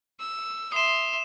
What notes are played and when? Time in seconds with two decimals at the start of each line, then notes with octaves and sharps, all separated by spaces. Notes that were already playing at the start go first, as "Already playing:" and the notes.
0.20 E6
0.72 E5 C6 D#6 E7